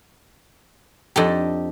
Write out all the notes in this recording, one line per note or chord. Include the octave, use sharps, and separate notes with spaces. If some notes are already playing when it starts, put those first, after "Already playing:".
F2 D4 D#4 G4 A4 D#5